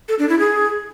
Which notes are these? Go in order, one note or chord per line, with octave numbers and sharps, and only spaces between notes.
A4
D4
E4
G#4